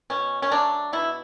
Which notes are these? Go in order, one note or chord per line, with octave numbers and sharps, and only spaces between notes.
B2 C#4
C#4
F#3 A3 D4
B2 E4